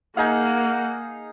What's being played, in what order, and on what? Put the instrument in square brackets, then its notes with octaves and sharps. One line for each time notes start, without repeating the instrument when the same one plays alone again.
[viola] A#3 [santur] D#4 G#4 F5 [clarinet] F#5